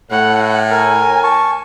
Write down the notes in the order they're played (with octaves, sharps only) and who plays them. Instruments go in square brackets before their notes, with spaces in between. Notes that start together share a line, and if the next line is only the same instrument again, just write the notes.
[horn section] A2 [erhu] F#5
[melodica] A#4 [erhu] G#5
[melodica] A5 C#6